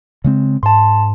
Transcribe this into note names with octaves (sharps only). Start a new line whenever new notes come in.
C#3 G#3 C4
G#2 A5 C6